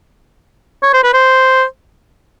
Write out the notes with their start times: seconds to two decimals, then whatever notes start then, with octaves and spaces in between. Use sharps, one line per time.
0.83 C#5
0.93 C5
1.04 B4
1.14 C5